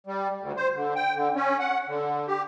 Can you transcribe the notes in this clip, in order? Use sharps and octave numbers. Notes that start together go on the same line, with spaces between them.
G3
D2
C5
D3
G5
D3
C#4
F#5
D3
G4